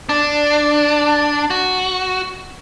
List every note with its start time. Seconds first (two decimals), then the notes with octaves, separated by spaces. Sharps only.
0.09 D4
1.50 F#4